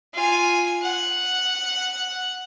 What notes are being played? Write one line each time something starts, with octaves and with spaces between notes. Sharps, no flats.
F4 G#5
F#5